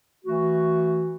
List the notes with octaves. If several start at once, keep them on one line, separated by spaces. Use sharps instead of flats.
E3 A3 F#4